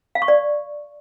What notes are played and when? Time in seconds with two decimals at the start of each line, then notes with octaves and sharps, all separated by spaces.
0.15 F5
0.22 C#6
0.28 D5